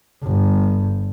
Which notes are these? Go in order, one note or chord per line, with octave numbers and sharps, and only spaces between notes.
G1